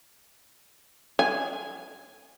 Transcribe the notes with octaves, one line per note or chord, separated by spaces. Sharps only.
G#5